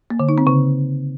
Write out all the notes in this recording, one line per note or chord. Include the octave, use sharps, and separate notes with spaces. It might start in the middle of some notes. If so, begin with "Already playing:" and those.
A#3
D3
D#4
C4
C#3